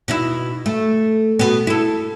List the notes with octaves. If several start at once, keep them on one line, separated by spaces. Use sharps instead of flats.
B2 D#4 E4
A3
B2 B3
E4 A4